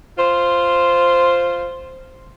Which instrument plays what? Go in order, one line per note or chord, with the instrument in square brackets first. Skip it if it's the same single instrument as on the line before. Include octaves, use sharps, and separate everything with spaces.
[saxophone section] F4 C5